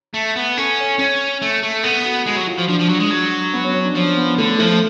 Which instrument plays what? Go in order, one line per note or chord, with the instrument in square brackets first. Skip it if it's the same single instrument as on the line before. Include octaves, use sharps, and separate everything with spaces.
[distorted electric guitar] A3
B3
[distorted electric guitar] C#4 [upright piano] A4
[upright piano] C#5
[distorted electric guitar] C#4 [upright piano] C#5
[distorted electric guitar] A3
A3
[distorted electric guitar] B3 [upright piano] A4
[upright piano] F#4
[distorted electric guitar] G#3 [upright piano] F#4
[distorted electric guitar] F#3
[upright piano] F4
[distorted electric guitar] F3
[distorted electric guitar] F3 [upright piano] D4
[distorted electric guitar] F3
F#3
G#3
F#3
[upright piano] B3
C#4
C#4
D4
[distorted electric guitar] F3 [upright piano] C#4
[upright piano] B3
[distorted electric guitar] D3 [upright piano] A3
[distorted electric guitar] F3 [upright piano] A3